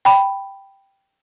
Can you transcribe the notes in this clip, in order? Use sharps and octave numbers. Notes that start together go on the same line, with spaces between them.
G5 B5